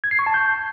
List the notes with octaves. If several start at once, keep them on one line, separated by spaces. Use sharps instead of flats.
G#6
C7
C#6
A5
G6